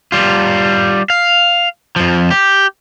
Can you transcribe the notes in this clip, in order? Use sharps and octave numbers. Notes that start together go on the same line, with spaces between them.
G3 F4
F5
F2 F3
G4